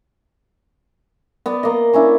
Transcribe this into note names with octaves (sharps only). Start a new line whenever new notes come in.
B3 D5
A#3 D#5
C#4 D4 E4